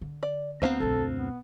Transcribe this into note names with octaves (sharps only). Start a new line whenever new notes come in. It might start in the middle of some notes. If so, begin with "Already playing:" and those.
D3
D5
D2 G3 B3 C4 C5 F5 A#5
B1 F#2 A4
B3